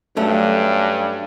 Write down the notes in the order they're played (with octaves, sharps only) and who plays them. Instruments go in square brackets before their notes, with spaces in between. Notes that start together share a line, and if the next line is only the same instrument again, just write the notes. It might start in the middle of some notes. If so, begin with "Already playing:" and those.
[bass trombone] G2 [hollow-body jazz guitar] F#3 A3 C#4